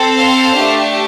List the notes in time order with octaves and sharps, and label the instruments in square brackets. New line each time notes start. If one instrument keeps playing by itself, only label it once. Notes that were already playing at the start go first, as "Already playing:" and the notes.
Already playing: [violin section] C4 A4
C5 F5
A3 D4 G4